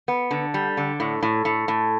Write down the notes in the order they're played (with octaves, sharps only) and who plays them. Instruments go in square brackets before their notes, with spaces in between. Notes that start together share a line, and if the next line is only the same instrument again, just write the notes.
[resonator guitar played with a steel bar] B3
D3
G3
D3
A2
A2
A2
A2